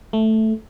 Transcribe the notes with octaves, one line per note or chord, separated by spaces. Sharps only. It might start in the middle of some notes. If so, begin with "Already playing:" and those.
A3